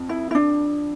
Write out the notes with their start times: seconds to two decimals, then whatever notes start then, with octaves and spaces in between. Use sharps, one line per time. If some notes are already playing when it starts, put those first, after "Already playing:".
Already playing: F2
0.09 E4
0.31 E4
0.35 D4